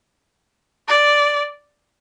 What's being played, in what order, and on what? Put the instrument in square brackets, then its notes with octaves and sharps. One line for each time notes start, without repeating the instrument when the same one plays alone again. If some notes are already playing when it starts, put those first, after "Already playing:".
[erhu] D5